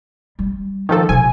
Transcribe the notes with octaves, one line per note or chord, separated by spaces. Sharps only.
G3
D#3 F3 A4
C3 F#3 G#5